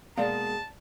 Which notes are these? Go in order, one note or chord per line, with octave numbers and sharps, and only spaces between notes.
B2 G#3 A#3 G#4 D5 F5 A5